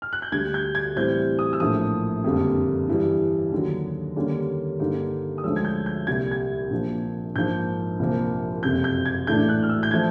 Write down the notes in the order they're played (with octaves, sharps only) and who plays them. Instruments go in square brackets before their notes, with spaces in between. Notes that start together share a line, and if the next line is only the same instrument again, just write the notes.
[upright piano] F6
F#6
G6
D2 D3 G3 G#6
G6
G#6
A2 E3 G3 C4 G6
D#6
E6
A#1 A2 F3 A#3 D#6
F#1 F2 D3 G3 A#3
G2 E3 G3
D#2 D3 F#3
D#2 D3 G3 A#3 C#4
G2 D3 G3 A#3 D#4
D#6
D2 D3 F3 G#3 C#4 E6
G#6
G6
G6
C2 A#2 G3 G#6
G#6
A#1 A#2 F3 A#3
A#1 G#2 F3 A#3 G6
C2 A#2 F3 A#3
F#1 F2 C3 G6
G6
G#6
A#1 A2 E3 A3 D4 G6
F#6
F6
E6
G6
F3 A3 G#6